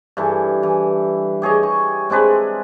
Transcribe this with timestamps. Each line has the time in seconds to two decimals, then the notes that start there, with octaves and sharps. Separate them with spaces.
0.17 G2 E3 A4
0.63 E3
1.42 G4 G#4 C#5 D#5
1.63 C#6
2.10 G#3 C4 D4 B4